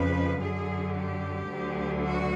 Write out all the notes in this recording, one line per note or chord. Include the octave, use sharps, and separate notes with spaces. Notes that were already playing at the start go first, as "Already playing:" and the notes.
Already playing: F2 C#3 F3 B4
F#2 D3 F#3 G#4
G4
D2 D3 F#3
F#4